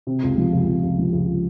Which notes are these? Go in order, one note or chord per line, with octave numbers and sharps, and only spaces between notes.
C3
C#2
F3
C#2
C3
C#2
F3
C#2